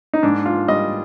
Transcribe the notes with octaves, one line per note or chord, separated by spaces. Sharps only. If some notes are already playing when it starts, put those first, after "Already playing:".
D#4
G#2 D4
F4
G3 D#5